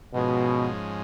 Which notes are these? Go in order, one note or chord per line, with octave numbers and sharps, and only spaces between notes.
G#2 B2 F3 G#3 C#4